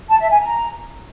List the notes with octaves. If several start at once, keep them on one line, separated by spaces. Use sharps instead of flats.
A5
E5
G#5
A#5